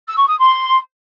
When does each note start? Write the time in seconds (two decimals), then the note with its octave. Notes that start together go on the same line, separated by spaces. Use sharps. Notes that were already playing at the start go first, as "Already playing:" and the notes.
0.07 E6
0.18 C#6
0.28 D#6
0.38 C6